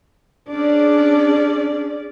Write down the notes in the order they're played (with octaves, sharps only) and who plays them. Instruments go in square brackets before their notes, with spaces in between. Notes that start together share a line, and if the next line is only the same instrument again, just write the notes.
[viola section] C#4 G#4 D5 [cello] D4